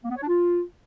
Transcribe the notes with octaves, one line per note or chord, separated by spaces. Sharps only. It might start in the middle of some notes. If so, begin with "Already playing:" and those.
A#3
B3
C#5
D4
F4